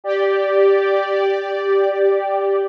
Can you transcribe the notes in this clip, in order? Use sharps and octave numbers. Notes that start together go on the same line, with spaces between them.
G4 D5